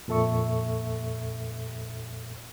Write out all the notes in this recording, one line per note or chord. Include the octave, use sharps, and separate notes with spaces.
F2 A#2 A4 E5 C#6